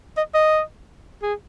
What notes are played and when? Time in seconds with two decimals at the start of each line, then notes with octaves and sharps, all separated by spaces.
0.17 D#5
0.35 D#5
1.23 G#4